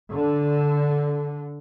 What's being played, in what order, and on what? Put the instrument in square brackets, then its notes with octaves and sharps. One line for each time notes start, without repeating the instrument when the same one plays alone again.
[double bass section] D3